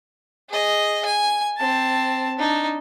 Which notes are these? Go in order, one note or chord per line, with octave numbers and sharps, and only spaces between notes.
G#4 D#5
G#5
C4 A5
D4 D#4